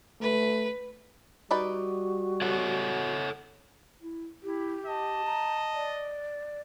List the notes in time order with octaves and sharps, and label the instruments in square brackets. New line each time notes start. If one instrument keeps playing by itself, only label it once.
[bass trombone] A3 [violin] B4
[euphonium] G3 [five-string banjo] D#4 B4 D5 [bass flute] F#4
[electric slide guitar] A4 C#5 F#5
[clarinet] E4
[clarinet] E4 [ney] G4
[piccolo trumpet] D#5 [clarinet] A5
[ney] A#5
D5